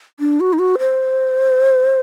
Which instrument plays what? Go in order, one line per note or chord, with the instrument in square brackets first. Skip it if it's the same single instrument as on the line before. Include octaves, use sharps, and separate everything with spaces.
[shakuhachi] D4
F#4
D#4
F#4
C5